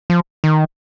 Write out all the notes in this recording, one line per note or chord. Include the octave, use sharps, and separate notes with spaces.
F3
D#3